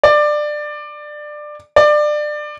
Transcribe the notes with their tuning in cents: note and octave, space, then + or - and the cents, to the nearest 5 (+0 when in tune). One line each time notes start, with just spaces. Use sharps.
D5 +20
D5 +25